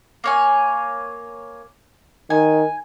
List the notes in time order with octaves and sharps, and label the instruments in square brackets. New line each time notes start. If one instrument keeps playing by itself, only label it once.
[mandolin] A#3 C#5 G#5
[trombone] D#3 [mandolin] G#5